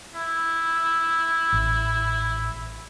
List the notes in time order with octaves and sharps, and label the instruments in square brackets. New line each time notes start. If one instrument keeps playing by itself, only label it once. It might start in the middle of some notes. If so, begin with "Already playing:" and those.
[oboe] E4
[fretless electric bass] A1